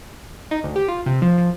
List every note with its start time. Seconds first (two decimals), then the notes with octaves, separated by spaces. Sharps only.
0.51 D#4
0.64 D2
0.76 G4
0.88 F4
1.06 C3
1.22 F3
1.38 F3